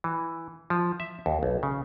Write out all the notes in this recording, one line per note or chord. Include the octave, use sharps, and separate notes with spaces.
E3
F3
E5
D#2
B1
C#3